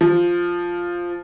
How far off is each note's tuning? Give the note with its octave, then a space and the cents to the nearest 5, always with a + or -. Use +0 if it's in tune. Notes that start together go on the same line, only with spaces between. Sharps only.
F3 +0